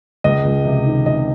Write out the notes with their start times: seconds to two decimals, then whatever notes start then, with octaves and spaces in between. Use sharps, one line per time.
0.24 C#2 D#5
0.45 C#2
0.65 C3
0.86 D#3
1.06 C3 D#5